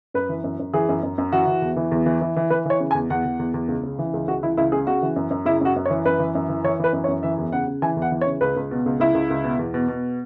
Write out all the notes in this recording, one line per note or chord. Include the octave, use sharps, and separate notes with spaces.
F#2 B4
E3
F#2
F#2
E3 G#4
F#2
F#2
F#2
E3 F#4
E3
E2
E3
E2
E3
E3
E3
E3 B4
E3 C#5
C#3
G#5
E2
E2 F#5
E2
E2
E2
C#2
C#3
E3
C#2
C#2 F#4
E3 E4
C#2 E4
C#3 G#4
C#3 F#4
E3
F#2
F#2
C#3 E4
F#2 F#4
F#2
C#5
E3
F#2 B4
E3
F#2
E3
E3 C#5
E3 B4
F#2
C#5
F#2
E3 E5
E2
C#3 F#5
C#3
E3 G#5
E2
F#5
E3
C#5
C#3
C#2 B4
C#2
B2
C#2
C#2 E4
C#2
C#2
B2
E2
B2
B2